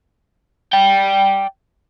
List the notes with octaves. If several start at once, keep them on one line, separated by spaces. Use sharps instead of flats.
D5 G5